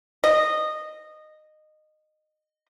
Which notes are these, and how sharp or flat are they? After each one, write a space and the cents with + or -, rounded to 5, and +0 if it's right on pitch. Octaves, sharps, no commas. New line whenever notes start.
D#5 -15